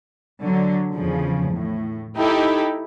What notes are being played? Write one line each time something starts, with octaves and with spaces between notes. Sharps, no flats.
D3 F#3
E2 C#3 F3
A2
D#4 E4 G4 A4